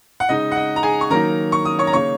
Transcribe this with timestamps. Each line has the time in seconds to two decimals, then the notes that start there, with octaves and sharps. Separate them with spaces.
0.20 F#5
0.29 C#3 G#3 D#4 D#5
0.52 F#5
0.56 D#5
0.76 A#5
0.83 G#4 G#5
1.01 C#6
1.10 D#3 F#3 A#3 D#4 A#4 A#5
1.52 C#6
1.65 D#6
1.79 C#5 C#6
1.87 A#5
1.93 C#3 A#3 D#4 C#5 C#6